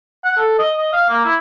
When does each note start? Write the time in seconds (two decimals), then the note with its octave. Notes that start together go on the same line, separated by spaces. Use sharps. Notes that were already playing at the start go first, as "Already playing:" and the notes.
0.24 F#5
0.37 A4
0.59 D#5
0.77 D#5
0.93 F5
1.09 A#3
1.25 E4